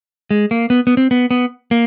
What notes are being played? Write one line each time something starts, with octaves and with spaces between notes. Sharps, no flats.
G#3
A#3
B3
B3
C4
B3
B3
A#3